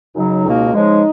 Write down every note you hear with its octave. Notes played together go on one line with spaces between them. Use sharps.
F#2 C#3 F#3 D#4
C#2 B2 A#3
C#3 F3 G#3 D#4